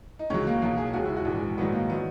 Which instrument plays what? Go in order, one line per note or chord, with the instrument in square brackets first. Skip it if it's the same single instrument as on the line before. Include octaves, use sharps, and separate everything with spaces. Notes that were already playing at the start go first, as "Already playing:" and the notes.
[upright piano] D#4
C#2 C#3 F#3 C#4
A#3
B1 B2 F#3 A#3
G#4
E1 D#2 C#3 F#4
E4
F#4
A#1 G#2 E3
A#1 G#2 D#3 F#3 B3
A#3
D#3 F#3 B3